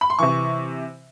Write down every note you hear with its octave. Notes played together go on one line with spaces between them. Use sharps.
B5
C6
C3 E3 C#6